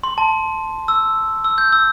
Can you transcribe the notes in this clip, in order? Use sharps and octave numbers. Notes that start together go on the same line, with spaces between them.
C6
A5
E6
E6
G6
E6